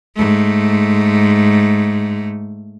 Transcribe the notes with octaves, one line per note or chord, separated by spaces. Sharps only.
G#2 A3